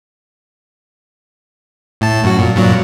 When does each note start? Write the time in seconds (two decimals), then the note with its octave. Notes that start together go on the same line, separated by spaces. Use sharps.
2.01 A2 A5
2.24 F#2 F#4
2.39 A#2
2.55 G2 A#2 F#3